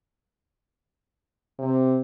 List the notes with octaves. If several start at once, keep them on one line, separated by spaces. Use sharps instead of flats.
C3